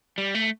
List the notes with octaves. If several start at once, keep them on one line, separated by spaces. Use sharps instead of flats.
G3
A3